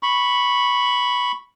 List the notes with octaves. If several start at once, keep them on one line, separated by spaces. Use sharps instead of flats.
B5 C#6